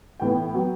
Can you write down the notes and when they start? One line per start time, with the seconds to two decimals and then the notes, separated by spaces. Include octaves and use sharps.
0.20 A2 E3 B3 G5
0.54 F#3 B3